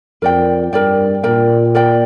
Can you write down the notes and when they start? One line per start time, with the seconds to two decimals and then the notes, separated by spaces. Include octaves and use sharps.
0.22 F2 A#4 D5 G5
0.72 G2 A#4 D5 G5
1.23 A#2 A#4 D5 G5
1.75 A#4 D5 G5